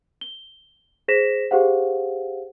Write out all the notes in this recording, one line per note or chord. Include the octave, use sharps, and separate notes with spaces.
G7
G#4 C5 A#6 B6 E7
G4 G#4 C5 F5 F#5